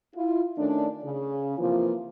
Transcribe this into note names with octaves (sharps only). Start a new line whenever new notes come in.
E4 F4
D#3 A3 C#4 D4
C#3
C3 E3 F3 A#3 F4